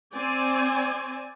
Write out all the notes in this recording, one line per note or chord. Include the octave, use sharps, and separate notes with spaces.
C4 D5 G#5